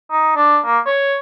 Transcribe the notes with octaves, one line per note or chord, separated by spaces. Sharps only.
D#4
D4
A#3
C#5